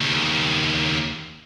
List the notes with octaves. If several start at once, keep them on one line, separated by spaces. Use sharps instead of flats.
D#2 C#3